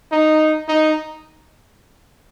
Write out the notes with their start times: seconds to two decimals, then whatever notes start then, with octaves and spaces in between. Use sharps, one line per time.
0.12 D#4
0.69 D#4